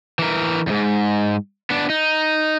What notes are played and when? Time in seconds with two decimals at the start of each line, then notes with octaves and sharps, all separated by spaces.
0.19 E3 A#4
0.67 E2 G#2
1.70 B3 D4
1.90 D#4